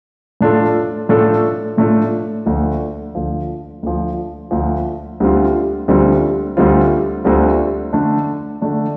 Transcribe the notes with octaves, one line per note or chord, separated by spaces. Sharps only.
A2 A3 D4 F4 A4
A2 A3 D4 F4 A4
A2 A3 D4 F4 A4
D2 D3 F3
D2 D3 F3
D2 D3 F3
D2 D3 F3
D2 D3 G3 C4 F4
D2 D3 G3 C4 F4
D2 D3 G3 C4 F4
D2 D3 G3 C4 F4
D3 A3 D4
D3 A3 D4